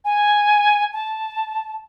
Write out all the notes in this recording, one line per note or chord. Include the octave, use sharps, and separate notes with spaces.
G#5
A5